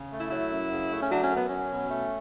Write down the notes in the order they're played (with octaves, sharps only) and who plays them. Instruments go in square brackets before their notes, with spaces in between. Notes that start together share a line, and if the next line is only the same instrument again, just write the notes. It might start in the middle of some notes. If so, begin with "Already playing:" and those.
Already playing: [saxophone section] C#3
A3
E4
F#3 E4
F#2
C#3
A3
C#4
F#3 D4
C#4
F#2
B3
F#3 C#4
B2
A3